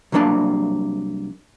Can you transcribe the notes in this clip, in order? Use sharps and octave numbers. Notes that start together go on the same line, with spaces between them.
C2 B2 F#3 A#3 D4 A5